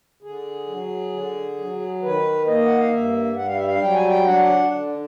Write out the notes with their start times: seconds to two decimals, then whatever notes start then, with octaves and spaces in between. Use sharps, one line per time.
0.23 D3 G#4
0.67 F#3
1.13 D3
1.58 F#3
2.02 D#3 B4
2.47 A#3 D#5
2.66 F#5
2.78 F5
2.92 G2 E5
3.37 G3 F#5
3.46 F5
3.56 E5
3.67 F5
3.81 F#3 G5
3.94 G#5
4.08 G5
4.26 D4 F#5
4.71 D3